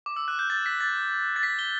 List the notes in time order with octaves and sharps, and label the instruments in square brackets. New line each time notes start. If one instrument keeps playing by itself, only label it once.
[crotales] D6
E6
F#6
G6
A6
B6
A6
A6
B6
G7